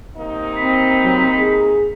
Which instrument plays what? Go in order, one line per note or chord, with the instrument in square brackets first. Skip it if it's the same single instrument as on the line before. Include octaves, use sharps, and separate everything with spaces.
[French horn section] C3 A#3 D#4
[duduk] C4 [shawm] B5
[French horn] F#3
G#4